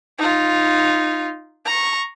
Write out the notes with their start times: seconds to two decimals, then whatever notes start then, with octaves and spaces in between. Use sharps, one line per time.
0.19 D#4 F4
1.66 A#5 C#6